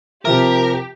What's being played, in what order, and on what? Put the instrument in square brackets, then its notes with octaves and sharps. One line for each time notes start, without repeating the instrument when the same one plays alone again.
[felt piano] C3 F3 E5 [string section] G4 [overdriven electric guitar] A#4